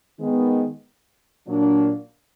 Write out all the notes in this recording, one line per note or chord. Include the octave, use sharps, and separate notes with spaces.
D#3 G#3 B3
A#2 F#3 A#3 D4